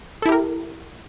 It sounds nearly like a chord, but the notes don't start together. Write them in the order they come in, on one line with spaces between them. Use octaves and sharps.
A4 E4 G4 A#4